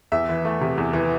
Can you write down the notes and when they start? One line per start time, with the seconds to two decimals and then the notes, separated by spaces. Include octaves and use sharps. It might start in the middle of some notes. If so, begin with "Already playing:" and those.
0.12 E2 E5
0.29 E3
0.45 A3
0.61 C3
0.78 E2
0.93 E3